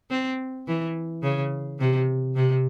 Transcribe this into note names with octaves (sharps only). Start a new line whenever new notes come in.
C4
E3
C#3
C3
C3